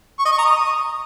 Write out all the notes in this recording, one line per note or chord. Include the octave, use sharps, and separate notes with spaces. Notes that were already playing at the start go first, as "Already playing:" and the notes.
C#6
D#5
C#6
A#5
D#6